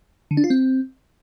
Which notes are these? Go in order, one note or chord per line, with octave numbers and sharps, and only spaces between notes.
D3
D4
F4
C4